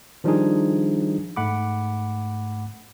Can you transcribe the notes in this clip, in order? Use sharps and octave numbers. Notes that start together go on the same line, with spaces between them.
D#3 F3 G3 D4 D#4 G#4
G#2 A3 F#5 B5 D6